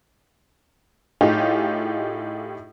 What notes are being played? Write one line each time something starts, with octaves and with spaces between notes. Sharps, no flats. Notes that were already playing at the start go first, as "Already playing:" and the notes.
A2 D#4 F4 G4 G#4